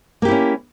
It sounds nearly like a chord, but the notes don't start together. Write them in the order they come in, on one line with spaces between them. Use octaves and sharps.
A#3 G4 E4 C#4